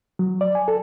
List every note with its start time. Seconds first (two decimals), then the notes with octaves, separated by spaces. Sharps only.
0.19 F#3
0.41 D5
0.55 G#5
0.68 A4